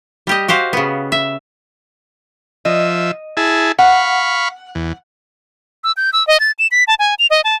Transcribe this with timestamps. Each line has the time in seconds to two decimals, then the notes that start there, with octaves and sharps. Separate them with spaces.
0.27 G3 G4 D#5
0.48 F#4 G4 C5 F5
0.73 C#3 B3
1.12 E5
2.65 F3 D#5 E5
3.37 E4 G#4 A5
3.79 F5 F#5 B5 C#6
4.75 E2
5.84 E6
5.97 G6
6.13 E6
6.27 D#5
6.40 A6
6.59 E7
6.71 B6
6.87 A5
6.99 G#5
7.19 F7
7.30 D#5
7.44 A5